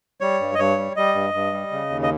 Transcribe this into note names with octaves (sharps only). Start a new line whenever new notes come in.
G3 C#5
G2
D#5
G2 C#5
G3
G3 D#5
G2
G2
G3
C#3
D#2
D#5